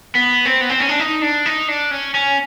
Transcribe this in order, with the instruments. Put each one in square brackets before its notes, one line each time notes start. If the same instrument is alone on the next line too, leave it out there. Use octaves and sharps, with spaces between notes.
[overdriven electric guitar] B3
C4
B3
C4
C#4
D4
D#4
D4
D#4
D4
C#4
C#4